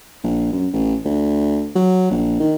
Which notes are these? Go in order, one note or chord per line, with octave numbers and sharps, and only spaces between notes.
A#1
F#2
A1
D2
F#3
A#1
D#3